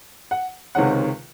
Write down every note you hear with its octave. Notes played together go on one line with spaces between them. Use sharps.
F#5
C#2 C3 D#3 G#3 C#4 F#5